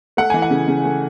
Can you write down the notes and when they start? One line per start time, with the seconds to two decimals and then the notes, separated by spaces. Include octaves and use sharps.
0.17 A3 F#5
0.30 E3 G#5
0.42 F#5
0.50 C#3
0.68 C#3
0.84 A3